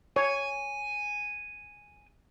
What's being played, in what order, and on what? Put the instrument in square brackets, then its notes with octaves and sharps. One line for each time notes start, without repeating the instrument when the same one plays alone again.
[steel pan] C#5 [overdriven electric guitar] G#5